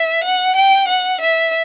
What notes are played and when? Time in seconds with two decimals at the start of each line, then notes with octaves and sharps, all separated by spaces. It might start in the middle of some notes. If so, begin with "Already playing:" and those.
Already playing: E5
0.24 F#5
0.56 G5
0.88 F#5
1.21 E5